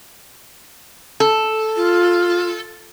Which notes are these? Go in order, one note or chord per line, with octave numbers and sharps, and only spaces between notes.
A4
F4